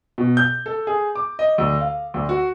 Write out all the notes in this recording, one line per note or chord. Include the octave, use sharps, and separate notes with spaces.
B2
G6
A4
G#4
D6
D#5
D2
F5
D2
F#4